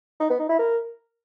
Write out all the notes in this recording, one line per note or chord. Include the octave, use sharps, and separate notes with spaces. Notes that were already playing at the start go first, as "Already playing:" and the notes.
D#4
B3
D#4
E4
A#4